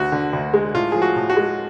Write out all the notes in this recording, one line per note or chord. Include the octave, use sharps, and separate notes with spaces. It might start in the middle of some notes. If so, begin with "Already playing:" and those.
Already playing: D2 F#4
D3
D2
G#3
A2 F4
F3 G#4
F#4
A2
F#4
G#3